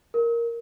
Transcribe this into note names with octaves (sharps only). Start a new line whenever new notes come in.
A#4